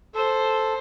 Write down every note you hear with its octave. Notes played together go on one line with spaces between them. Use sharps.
A4 C5